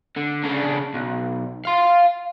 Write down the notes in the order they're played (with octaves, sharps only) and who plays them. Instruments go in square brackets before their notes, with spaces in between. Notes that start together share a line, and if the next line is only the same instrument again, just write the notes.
[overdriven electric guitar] D3
C#3 D4
B1
F5 C6